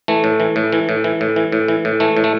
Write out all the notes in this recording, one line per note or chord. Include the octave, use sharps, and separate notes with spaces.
E3 A3
A2
E3
A2
E3
A2
E3
A2
E3
A2
E3
A2
E3 A3
A2
A3